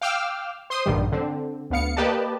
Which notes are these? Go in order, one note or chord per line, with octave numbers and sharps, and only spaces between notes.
F5 G5 D6 E6 F6
C5 C6 D#6
A#1 G2 D3 D#3 G3
D3 C4
D2 B3 F5 C#7
A#3 G4 B4 D5 D#5 A5